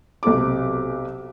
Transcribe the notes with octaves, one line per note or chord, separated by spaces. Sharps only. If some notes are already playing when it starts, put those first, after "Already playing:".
B1 C3 A4 D6